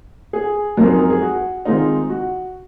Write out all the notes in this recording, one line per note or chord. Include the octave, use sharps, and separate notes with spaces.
G#4
F#2 F3 G#3 C4 D#4 A#4
G#4
A#4
G#4
F#4
D#3 G#3 C4 D#4 F4
F#4